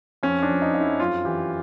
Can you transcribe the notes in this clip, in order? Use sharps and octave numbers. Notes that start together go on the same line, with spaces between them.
F2 C#4
D4
F3
D#4
F2 D#4
E4
F#2 F4
E3 G4